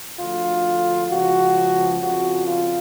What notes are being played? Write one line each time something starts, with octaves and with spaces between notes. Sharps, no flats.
D2 D3 F3 F4
C#2 C#3 F3 F#4
F2 C#3 F3 F#4
F4